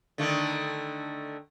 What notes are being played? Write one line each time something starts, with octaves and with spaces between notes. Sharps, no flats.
D3 D#3 A3